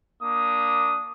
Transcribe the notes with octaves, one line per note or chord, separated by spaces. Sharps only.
A#3 D4 D#6